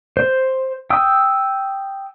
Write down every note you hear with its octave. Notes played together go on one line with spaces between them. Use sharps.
C5
G5 D#6 E6